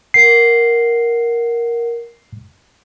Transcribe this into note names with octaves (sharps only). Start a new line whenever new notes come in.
A#4 F#5 C7